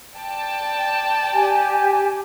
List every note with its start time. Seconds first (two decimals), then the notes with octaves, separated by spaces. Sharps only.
0.13 D5 G5 A5
1.33 G4 G#5